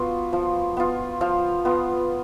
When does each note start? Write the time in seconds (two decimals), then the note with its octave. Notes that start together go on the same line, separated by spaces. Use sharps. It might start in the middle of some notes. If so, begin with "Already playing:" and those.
Already playing: B3 F4 F#4
0.33 F3
0.77 B3 F4
1.21 F3 F5
1.65 B3 F4